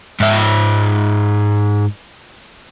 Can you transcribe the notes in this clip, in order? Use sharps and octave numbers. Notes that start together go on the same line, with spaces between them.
G#2 E5